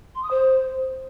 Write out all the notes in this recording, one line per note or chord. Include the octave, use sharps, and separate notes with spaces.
C6
D#6
C5